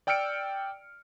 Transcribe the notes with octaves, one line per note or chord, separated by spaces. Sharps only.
D5 G5 E6 F6 C#7 D7